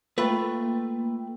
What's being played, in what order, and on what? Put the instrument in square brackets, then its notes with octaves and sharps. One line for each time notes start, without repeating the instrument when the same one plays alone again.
[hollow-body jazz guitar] A3 F4 B4 [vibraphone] A#3 G5